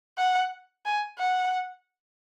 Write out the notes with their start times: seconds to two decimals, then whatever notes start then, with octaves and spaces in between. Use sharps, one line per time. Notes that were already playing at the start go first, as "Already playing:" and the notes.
0.18 F#5
0.85 G#5
1.19 F#5